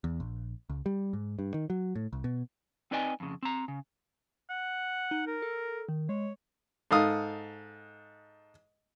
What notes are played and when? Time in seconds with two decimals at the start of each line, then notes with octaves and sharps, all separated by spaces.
0.04 E2
0.20 A#1
0.70 C#2
0.86 G3
1.13 G#2
1.39 G2
1.54 D#3
1.70 F#3
1.95 A2
2.13 C2
2.24 B2
2.91 C4 D#4 B4 D5 D#5 G#5
3.20 F2 C#3
3.43 C4 A#5
3.68 C#3
4.50 F#5
5.11 D#4
5.27 A#4
5.42 A4
5.89 D#3
6.09 G#3 C#5
6.91 G#2 A4 F5 D#6